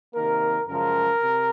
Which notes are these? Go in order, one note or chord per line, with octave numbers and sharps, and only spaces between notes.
C3 D#3 A#3 A#4
F#2 C#3 F3 G#3 A#4
C3